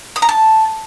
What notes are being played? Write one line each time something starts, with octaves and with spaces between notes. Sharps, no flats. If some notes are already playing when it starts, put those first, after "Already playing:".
D#6
A#5
A5